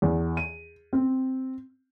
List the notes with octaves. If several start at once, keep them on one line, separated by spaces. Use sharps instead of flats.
E2
D#7
C4